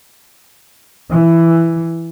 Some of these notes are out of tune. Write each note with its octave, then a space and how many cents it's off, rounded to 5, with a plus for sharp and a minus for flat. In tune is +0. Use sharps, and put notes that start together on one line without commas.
E3 +10